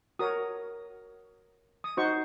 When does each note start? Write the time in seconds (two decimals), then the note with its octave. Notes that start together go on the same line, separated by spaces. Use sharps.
0.19 F#4 A#4 C#5 D#6
1.84 D#6
1.97 D#4 F#4 C5 C#6